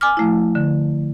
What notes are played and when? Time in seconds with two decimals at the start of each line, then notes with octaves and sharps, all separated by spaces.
0.01 G#5 D6 F6
0.17 F3 A3 E4
0.55 D3